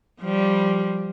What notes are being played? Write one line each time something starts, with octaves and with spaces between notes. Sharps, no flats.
F3 G3